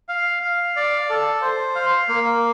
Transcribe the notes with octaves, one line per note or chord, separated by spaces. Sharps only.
F5
F5
D5
A4
C5
F5
A#3